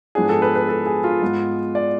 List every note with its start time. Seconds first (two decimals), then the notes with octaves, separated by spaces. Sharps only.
0.15 G#2 F3 B3 D4 G#4
0.29 A4
0.42 B4
0.55 B4
0.68 A4
0.86 G#4
1.04 F4
1.22 G#2 G#3 B3
1.75 D5